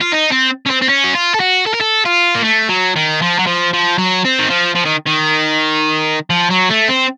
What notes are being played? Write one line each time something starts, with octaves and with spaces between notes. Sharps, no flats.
F4
D#4
C4
C#4
C4
C4
C#4
F#4
F4
A4
F#4
A4
A#4
A4
F4
A#3
A3
F#3
D#3
F3
F#3
F3
F3
F#3
C4
D#3
F3
F3
D#3
D#3
F3
F#3
A3
C4